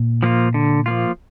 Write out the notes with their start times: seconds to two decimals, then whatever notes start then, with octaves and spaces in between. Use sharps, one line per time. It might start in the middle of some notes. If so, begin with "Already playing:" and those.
Already playing: A#2
0.23 F3 A#3 F4
0.54 D3
0.86 F3 A#3 F4